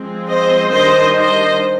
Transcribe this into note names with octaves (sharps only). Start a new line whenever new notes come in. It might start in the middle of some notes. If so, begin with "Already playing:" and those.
Already playing: F3 G#3 C4
C5 D#5
D#3 G3 D4 C5 D#5
C5 D#5